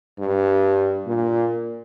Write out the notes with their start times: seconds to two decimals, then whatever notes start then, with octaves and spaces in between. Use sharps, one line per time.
0.19 G2
1.07 A#2